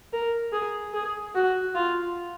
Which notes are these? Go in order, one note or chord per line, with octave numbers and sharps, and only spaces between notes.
A#4
G#4
G#4
F#4
F4